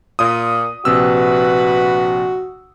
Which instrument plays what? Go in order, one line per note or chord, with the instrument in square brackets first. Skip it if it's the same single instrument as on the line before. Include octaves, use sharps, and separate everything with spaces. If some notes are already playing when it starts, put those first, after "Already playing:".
[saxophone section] A#2 [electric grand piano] D#6
[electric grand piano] A#1 C3 E6 [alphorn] F#4 [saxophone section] B4